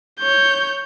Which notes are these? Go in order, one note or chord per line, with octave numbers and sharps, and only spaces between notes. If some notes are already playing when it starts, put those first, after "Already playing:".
C#5 G6